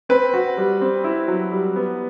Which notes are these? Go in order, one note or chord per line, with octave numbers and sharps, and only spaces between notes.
C4 B4
F#4
G3
C4
E4
F#3
G3
B3